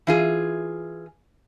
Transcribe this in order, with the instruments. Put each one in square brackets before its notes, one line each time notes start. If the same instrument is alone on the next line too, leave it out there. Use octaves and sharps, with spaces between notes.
[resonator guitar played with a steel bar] E3 F4 G#4